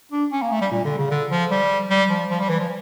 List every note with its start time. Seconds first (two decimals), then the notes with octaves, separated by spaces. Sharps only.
0.12 D4
0.32 C#4
0.42 A#3
0.52 A3
0.61 G3
0.72 A#2
0.85 D3
0.98 C#3
1.11 D3
1.31 F3
1.51 G3
1.90 G3
2.10 F3
2.30 F3
2.40 G3
2.50 E3
2.60 F3